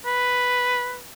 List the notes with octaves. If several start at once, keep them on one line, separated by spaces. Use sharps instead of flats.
B4